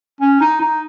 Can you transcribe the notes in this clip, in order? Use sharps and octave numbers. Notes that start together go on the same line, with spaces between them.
C#4
D#4
D#4